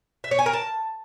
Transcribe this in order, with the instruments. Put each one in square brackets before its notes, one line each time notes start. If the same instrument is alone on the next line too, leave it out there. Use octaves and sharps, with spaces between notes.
[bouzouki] E5
C#5
G#5
A#4
A5